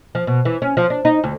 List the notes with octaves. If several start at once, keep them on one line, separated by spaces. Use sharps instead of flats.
F3
B2
E3
C#4
F3
D4
D#4
D2